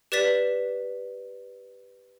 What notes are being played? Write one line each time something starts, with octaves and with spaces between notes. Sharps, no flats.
G4 B4 D5 A6 B6 E7